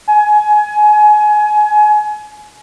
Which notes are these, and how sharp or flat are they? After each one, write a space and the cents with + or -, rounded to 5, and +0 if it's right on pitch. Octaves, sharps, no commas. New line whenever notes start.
G#5 +25